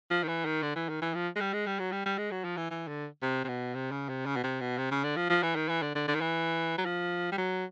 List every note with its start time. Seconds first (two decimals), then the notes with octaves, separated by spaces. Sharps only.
0.11 F3
0.23 D#3
0.28 E3
0.45 D#3
0.62 D3
0.75 E3
0.89 D#3
1.02 E3
1.14 F3
1.36 G#3
1.40 G3
1.53 G#3
1.66 G3
1.79 F#3
1.92 G3
2.06 G3
2.18 G#3
2.31 F#3
2.44 F3
2.57 E3
2.70 E3
2.88 D3
3.22 C3
3.44 C3
3.48 B2
3.74 C3
3.91 C#3
4.09 C3
4.26 C#3
4.36 B2
4.43 C3
4.61 B2
4.78 C3
4.91 C#3
5.04 D3
5.16 F3
5.29 F3
5.43 E3
5.56 D#3
5.69 E3
5.82 D3
5.95 D3
6.08 D3
6.15 D#3
6.21 E3
6.78 F#3
6.85 F3
7.32 G3
7.38 F#3